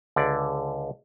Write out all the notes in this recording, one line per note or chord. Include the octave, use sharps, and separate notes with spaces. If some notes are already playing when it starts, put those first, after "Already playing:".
C#2 D3 D5